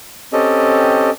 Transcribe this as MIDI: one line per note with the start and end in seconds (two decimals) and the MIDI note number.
0.33 1.10 60
0.33 1.10 61
0.33 1.10 67
0.33 1.10 69
0.33 1.10 75